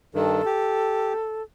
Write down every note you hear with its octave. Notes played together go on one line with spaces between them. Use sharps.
G2 D#3 A4
G4